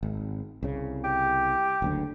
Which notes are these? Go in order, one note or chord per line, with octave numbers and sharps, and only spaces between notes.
G#1
C2 C#3
G4
F#1 D2 D3